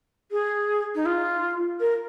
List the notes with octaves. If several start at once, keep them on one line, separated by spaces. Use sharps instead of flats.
G#4
D#4
F4
A#4